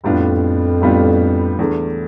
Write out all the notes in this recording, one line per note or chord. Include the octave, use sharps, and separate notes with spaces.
F2 A2 G3 B3 D4 F4
A2 G3 B3 D4 F4
E2 D3 A3